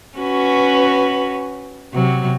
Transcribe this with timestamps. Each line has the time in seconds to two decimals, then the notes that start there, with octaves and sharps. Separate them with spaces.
0.18 C#4 F#4 B4
1.93 C3 F#3